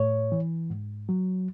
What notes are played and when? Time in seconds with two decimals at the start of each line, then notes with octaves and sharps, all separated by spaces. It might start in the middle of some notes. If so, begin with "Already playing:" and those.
Already playing: A2 C#5
0.32 E3
0.70 G#2
1.09 F#3